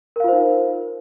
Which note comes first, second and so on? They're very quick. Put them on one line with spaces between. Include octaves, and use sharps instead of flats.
A#4 F5 F4 C5 D#4